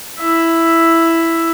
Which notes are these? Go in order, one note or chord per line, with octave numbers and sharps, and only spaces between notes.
E4 E5